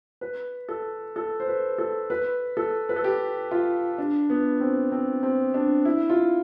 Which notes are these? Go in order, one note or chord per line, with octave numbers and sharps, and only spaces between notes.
B4
A4
A4
C5
B4
A4
B4
A4
B4
A4
G4
F4
D4
B3
C4
C4
C4
D4
E4
F4